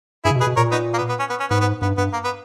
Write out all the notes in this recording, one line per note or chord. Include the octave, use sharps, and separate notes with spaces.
G2 E4 G#4
C#3
B2
G#4 B4
B2
A#2 A#4 C#5
B3 D#4
A#3
B3
B3
C#4
B3
C#4
G#2 B3
B3
G2 B3
G2 B3
A#3
B3